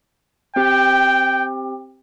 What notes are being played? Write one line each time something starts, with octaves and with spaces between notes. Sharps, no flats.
C4 G4 G5